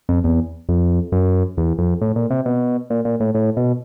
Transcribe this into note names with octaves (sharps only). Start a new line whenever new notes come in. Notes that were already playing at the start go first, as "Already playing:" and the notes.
F2
E2
F2
F#2
E2
F2
A2
A#2
C3
B2
A#2
A#2
A2
A2
B2